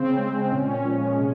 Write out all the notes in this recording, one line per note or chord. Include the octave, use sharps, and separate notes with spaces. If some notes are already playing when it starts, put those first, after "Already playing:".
Already playing: C#3 C4
G#3
A#2 C#4
F3 G#3
C3